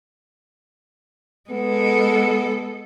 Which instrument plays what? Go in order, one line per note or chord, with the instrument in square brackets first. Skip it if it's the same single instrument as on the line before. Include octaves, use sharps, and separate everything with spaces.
[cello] G#3 A4 [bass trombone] B3